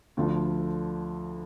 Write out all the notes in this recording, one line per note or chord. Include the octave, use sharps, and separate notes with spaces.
D2 D3 F3